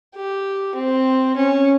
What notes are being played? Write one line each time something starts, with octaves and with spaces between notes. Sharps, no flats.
G4
C4
C#4